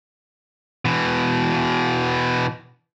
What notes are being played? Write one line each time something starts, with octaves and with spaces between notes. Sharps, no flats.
B2 E3